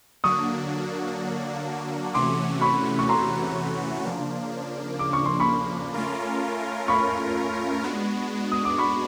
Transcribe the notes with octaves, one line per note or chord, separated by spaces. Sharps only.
D3 F#3 A#3 D4 F#4 C#6 D#6
C3 E3 A3 C#4 F#4 C6 D6
B5 C#6
C#6
A#5 C6
C#3 F3 A#3 D4
D6
C#6
C6
B5 C#6
A3 C#4 F4 A#4
B5 C#6
G#3 B3 D4 F#4
D#6
D6
B5 C#6